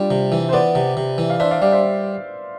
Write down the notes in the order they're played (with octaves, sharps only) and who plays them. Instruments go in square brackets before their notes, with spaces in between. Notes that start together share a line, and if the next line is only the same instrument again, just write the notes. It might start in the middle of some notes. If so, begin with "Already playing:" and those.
Already playing: [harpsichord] G3 [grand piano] D4 F4
[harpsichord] C3
E3
[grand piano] C5
[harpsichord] B3 [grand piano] B4 D5
[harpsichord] C3
C3
E3
[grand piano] F5
[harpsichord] D4 [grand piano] C5 E5
[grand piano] D5 F5
[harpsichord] G3 [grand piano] D5 F5
[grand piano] C5 E5